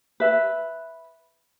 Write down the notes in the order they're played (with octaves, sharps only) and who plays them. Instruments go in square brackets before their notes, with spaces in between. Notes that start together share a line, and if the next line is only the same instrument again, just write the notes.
[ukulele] B4 E5